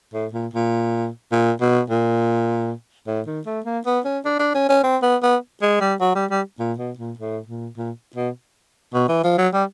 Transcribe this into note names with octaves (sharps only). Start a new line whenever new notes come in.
A2
A#2
A#2
A#2
B2
A#2
A2
D#3
A3
A#3
B3
C#4
D4
D4
C#4
C#4
C4
B3
B3
G#3
G3
F#3
G3
G3
A#2
B2
A#2
A2
A#2
A#2
B2
B2
E3
F3
F#3
G3